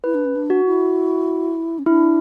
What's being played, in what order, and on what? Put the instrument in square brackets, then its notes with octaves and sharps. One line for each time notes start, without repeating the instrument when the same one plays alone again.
[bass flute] E4 [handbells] B4
[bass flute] D4
C#4
D4
[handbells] F#4
[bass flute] E4
C#4
[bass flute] D4 [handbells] E4